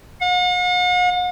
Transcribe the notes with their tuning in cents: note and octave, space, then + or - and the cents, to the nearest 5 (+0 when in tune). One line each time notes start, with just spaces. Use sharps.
F#5 -45